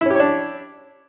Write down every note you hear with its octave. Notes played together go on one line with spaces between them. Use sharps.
C#4 D4 E4 G4 C#5